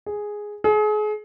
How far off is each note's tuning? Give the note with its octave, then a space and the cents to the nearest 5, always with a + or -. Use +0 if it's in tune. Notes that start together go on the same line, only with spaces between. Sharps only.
G#4 +0
G#4 +35